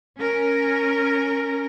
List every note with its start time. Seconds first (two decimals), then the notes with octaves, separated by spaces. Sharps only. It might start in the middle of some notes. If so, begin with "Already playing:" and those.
0.18 C#4 A#4